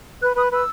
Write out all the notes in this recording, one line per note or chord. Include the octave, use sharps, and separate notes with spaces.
B4 F#6
B4 D#6
B4 E6